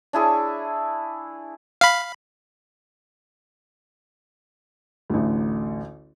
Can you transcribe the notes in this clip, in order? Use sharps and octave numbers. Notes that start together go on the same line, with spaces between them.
D4 E4 G#4 C#6
F5 B5
A1 D2